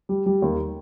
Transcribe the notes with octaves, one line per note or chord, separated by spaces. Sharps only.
G3
G3
D#2